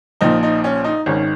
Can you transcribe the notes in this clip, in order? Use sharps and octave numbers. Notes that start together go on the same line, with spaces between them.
A#1 A#2 F3 D#4
D#4
C#4
D#4
G#1 G#2 D#3 C#4